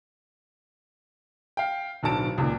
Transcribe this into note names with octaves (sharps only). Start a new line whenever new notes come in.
F5 G5
D1 B1 D3 A5 D7
C#2 A#2 D#3